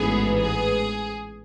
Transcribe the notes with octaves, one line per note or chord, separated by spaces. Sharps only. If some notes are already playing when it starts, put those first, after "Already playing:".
Already playing: A1 G#2 E3 B3 G#4
G#4